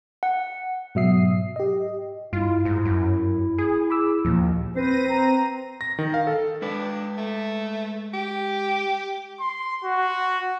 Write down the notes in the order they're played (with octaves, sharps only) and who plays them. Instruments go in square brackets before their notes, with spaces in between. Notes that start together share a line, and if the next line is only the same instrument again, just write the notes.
[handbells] F#5
[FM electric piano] G#2 B2 F#3 E5 D#6 C7
G4 D#5
[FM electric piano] G2 [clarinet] E4 [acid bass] F4
[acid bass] G#2
F#2
G#4
[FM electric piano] B5 D6 E6
[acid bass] D#2 [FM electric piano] A#2 F3
[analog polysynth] C4 A#6 D#7 [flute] B4 [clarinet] C5
[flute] A#5
[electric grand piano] A#6
D#3
F5
A4
[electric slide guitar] G#3 B4 [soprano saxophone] D4
[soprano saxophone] A3
G4
[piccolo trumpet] C6
F#4